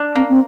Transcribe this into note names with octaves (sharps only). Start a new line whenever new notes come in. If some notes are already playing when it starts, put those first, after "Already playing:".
Already playing: D4
A#3 C4
C4